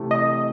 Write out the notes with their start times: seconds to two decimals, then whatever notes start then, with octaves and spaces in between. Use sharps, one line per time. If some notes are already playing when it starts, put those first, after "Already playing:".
Already playing: C3 E3 A3
0.11 D#5